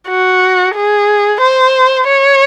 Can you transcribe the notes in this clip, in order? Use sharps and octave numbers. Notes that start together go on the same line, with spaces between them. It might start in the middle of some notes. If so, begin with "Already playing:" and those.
F#4
G#4
C5
C#5